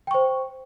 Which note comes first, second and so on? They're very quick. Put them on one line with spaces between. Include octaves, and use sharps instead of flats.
G5 C#6 C5